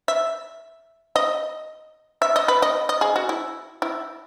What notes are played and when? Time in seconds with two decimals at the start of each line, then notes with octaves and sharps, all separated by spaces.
0.08 E5
1.16 D#5
2.22 E5
2.36 D#5
2.48 B4
2.62 D#5
2.89 D#5
3.01 G#4
3.16 F#4
3.29 E4
3.82 E4